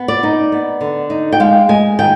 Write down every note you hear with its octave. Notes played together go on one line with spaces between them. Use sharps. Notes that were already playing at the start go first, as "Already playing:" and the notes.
Already playing: B3
D5
D#4
B3
D3
D#4
G5
G#3 F5
G#3 G#5
D#3 G5